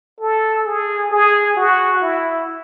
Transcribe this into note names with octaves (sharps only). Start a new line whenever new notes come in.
A4
G#4
G#4
F#4
E4